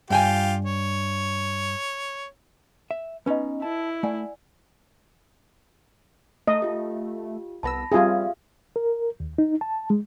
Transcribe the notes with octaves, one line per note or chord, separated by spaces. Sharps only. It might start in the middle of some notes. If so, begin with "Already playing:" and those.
G2 F4 G4 G5 G#5
C#5
E5
B3 C#4 D#4 B4 D#5
E4 A5
A3 D5 F#5 G#5
A3 D#5
F4 G4
C2 B3 A5 B5 E6 A#6
G3 C4 F4 G4 G#4 E5 F5
A#4
D#2
D#4
A5
G#3